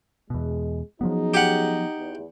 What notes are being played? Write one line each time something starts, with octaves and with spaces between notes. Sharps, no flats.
E2 B2 G#3
F3 F#3 B3 C#4 D#4 F#4 G#4
G4 F#5
E2